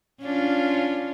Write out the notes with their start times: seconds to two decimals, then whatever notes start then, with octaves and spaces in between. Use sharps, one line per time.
0.22 C#4 D4 F4